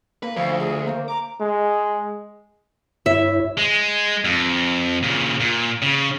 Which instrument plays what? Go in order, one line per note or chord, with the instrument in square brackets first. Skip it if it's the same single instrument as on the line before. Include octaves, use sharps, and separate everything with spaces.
[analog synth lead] A#3 [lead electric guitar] B4
[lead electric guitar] D2 [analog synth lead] F3 [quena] F5
[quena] G#4
[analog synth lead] A#3 [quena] C5
[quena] A#5 [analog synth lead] D6
[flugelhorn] G#3
[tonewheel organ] G2 E4 C#5 [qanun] E5
[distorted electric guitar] G#3
F2
A#2 C#3
A#2
C#3